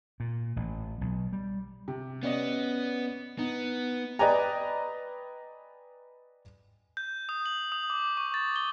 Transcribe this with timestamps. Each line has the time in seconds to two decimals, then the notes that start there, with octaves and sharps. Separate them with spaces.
0.20 A#2
0.56 A1
1.01 B1
1.33 G3
1.88 C3
2.23 B3 C#4 D5 D#5
3.39 B3 D#4
4.19 B4 D5 D#5 G5 G#5 A#5
6.97 G6
7.29 D#6
7.46 F#7
7.72 D#6
7.90 D6
8.17 C#6
8.34 A6
8.56 G7